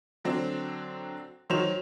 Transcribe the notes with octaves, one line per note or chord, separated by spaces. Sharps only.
D3 F#3 C4 D4
D#3 F#3 C5 C#5 E7 F7